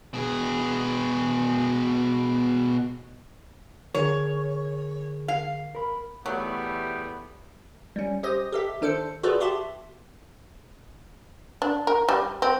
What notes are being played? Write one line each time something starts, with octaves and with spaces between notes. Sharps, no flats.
B2 G#4
D3 G#4 A#4 C#5
F5
A#4 B5
E2 F#3 G3 A3 B3
G3 C#4
G4 C5 D#5 D#6
G4 A4 E5
D#3 D4 A4 C5 C#7
F4 F#4 G#4 A4 B4 D5
F#4 G4 E5 A5 C6
D4
A#4
G3
C4